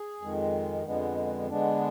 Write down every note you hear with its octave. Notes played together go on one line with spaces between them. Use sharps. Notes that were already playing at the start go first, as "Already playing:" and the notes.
Already playing: G#4
F2 D#3 G#3
F2 D3 G#3 B3
D3 G#3 B3 D4